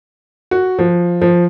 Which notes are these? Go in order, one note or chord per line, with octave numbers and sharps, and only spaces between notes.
F#4
F3
F3